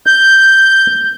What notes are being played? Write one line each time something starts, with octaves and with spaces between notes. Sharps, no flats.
G6